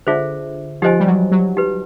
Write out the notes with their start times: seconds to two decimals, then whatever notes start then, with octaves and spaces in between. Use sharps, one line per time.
0.07 D3 F4 G#4 C5 E5
0.82 F3 D#4 G4 C5 D#5 G#5
1.00 G3
1.07 F#3
1.32 F#3
1.57 D#4 G4 B4